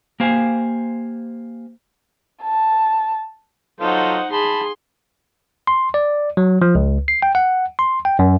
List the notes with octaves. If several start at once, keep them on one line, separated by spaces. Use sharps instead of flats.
A#3 G4 C5 F5 G#5
A5
F#3 D#4 F4 A4 C5 D#5 F#5
G#4 A5 B5 C6
C6
D5
F#3
F3
C#2
C7
G5
F#5
C6
G5
F#2